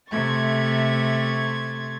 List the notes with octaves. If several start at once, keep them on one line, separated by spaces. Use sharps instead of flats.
C3 A3 C#6 G#6 A6